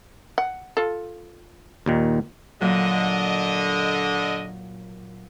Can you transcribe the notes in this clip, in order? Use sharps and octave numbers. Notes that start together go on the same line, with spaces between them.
F#5
F4 A4
D#2 A#2 D#3
A#2 D3 F#3 D#5